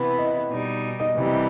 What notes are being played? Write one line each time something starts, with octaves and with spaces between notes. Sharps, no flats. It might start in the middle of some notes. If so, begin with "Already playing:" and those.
Already playing: C3 E3 B3 E4 B4
D#5
B2 G3 D#4
D#5
C3 E3 G3
D#5